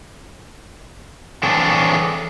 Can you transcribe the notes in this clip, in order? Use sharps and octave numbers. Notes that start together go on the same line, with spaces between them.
E3 C4 D4 G#4 A4 C#5